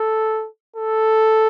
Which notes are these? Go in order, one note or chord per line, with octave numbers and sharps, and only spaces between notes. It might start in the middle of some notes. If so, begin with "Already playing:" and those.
Already playing: A4
A4